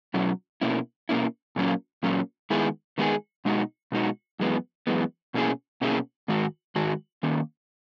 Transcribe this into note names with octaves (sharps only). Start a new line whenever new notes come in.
B2 F#3 C#4 E4
B2 A#3 C#4 E4
B2 A#3 C#4 E4
A#2 F#3 A#3 C#4
A#2 F#3 A#3 C#4
D#3 G#3 B3 E4 G#4
D#3 G#3 B3 E4 G#4
B2 G#3 D#4 F#4
B2 G#3 D#4 F#4
F#2 E3 G#3 B3
F#2 E3 G#3 B3
B2 A#3 C#4 E4 G#4
B2 A#3 C#4 E4 G#4
G#2 D#3 G#3 F#4
G#2 D#3 G#3 F#4
D#3 A#3 C#4